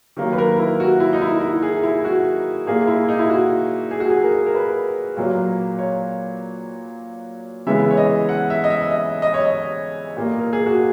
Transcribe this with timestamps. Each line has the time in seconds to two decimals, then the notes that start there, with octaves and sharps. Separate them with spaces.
0.17 D#3 F#3 A#3
0.33 B4
0.38 A#4
0.58 E4
0.80 F#4
1.00 E4
1.13 D#4
1.22 E4
1.41 E4
1.63 G#4
1.83 E4
2.05 F#4
2.66 A#2 A#3 G#4
2.87 E4
3.09 D#4
3.19 E4
3.30 F#4
3.91 G#4
4.00 F#4
4.10 G#4
4.23 A#4
4.46 A#4
4.55 B4
5.17 A#2 F#3 A#3
5.78 C#5
7.67 C#3 E3 G#3 B3 E5
7.91 C#5
7.97 D#5
8.29 F#5
8.50 E5
8.64 D#5
8.70 E5
8.91 D#5
9.22 D#5
9.34 C#5
9.45 D#5
10.17 A#2 A#3
10.40 A#4
10.53 G#4
10.66 F#4